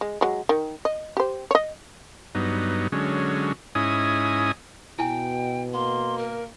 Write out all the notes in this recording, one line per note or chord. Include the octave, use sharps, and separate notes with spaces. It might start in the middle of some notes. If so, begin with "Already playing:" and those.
G#3
F#3 G#3
D#3
D#5
G4 C5
C#5 D#5
G2 F#3 B3 D#4
D3 F#3 G#3 C#4
G#2 C#4 E4 D#5 G#5 D#6
B2 E4 G5 G#5
A#3 C6
A#4